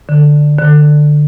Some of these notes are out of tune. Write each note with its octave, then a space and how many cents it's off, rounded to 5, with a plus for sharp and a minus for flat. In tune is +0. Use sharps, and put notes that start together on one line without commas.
D3 +10
D3 +20